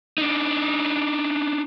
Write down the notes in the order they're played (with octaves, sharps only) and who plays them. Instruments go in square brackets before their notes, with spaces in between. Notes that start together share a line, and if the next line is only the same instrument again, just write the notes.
[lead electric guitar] D4 D#4